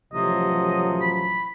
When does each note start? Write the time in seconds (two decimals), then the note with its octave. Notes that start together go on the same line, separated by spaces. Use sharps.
0.13 A1 C3 F3 F#3 D#5
1.01 B5